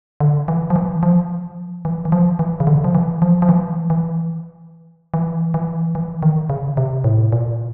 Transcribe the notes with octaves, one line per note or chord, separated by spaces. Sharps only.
D3
E3
F3
E3
F3
E3
E3
F3
E3
C#3
D3
F3
E3
F3
F3
E3
E3
E3
E3
E3
D#3
C#3
C3
A2
A#2